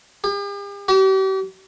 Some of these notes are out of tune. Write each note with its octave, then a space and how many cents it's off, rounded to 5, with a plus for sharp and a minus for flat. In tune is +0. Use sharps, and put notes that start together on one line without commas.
G4 +45
G4 -40